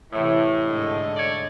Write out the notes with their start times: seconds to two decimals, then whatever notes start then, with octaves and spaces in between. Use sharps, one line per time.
0.12 A2 C3 E3
0.67 G#2 D3 D#5
1.16 A3 C#5 D5